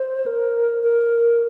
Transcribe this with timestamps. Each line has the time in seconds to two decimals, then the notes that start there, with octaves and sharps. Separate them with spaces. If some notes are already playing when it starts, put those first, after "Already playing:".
Already playing: C5
0.26 A#4
0.83 A#4